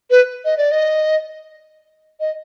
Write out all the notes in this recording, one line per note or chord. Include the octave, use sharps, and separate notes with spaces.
B4
D#5
D5
D#5
D#5